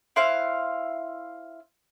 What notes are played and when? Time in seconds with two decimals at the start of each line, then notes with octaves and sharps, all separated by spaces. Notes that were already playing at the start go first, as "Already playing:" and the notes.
0.16 E4 C5 F5 F#6